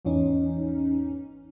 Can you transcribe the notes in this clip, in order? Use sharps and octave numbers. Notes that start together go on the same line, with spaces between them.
G#1 E2 E3 C#4 D#4